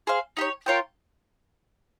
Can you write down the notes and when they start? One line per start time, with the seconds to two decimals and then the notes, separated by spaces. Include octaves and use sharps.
0.07 G#4 C5 F5
0.37 D#4 G4 C#5
0.66 F4 A#4 C#5 G5